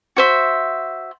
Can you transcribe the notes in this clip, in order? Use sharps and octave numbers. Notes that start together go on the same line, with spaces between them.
F#4 C5 E5